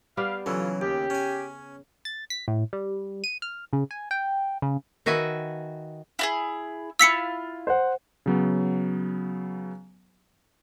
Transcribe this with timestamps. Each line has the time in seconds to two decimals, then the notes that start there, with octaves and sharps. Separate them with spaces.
0.17 G3 B3 G4 F5
0.46 C#3 E3 F#3 F4 A4
0.81 D#2 G4
1.10 C#4 G#5
2.05 A6
2.30 B6
2.48 A2
2.73 G3
3.24 D#7
3.42 F6
3.73 C#3
3.91 G#5
4.11 G5
4.62 C#3
5.06 D#3 F#4 B4 E5 G#5
6.19 E4 F#4 G#4
6.99 E4 F4 E6 B6 C#7
7.67 C5 F#5
8.26 C#3 F#3 B3